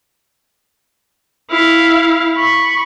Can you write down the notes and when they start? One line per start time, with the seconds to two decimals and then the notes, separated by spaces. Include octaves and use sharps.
1.50 E4 F5
2.36 B5 C#6